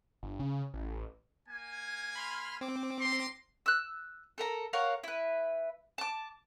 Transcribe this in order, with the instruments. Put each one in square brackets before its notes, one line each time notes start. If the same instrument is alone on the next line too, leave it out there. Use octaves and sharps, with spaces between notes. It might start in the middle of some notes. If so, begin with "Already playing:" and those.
[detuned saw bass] G1
C#3
A1
[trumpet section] A#3 G#5
[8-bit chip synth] B5 C6 F6
C4 D6
[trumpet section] A#5 C6
[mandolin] E6 F#6
A4 A#4 A#5
A#4 C#5 F5 F#5
E4 B4
A5 D6